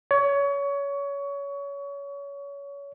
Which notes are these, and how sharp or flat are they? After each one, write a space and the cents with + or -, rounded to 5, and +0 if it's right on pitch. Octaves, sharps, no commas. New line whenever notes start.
C#5 +25